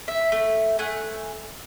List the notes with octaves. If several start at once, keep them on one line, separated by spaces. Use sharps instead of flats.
E5
A3
A3 F#5 G#5